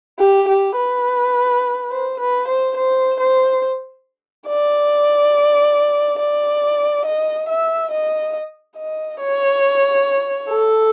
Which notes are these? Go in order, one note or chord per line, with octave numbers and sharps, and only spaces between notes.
G4
G4
B4
C5
B4
C5
C5
C5
D5
D5
D#5
E5
D#5
D#5
C#5
A4